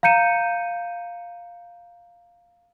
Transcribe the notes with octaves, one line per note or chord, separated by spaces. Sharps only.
F5 A#5 G6 C#7 D#7 E7